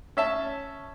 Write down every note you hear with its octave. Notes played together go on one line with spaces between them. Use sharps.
C#4 E5 A5